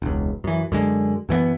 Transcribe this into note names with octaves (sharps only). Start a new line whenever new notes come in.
E1 C#2
F#2 E3
F#2 D3 G#3
F#2 E3 A3 B3